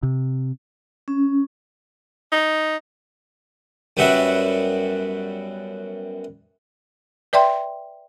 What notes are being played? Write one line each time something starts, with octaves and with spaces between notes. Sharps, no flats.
C3
C#4
D#4
F#2 G3 B3 F#4 E5
B4 D5 E5 G5 C6